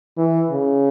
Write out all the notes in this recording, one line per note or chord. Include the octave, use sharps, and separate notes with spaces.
E3
C#3